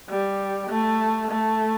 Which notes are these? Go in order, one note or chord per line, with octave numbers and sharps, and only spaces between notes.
G3
A3
A3